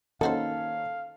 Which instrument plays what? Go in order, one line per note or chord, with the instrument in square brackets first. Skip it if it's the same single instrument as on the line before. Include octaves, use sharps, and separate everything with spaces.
[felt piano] D#3 A#3 C#4 [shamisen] D#4 F#4 C5 [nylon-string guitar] A4 [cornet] F5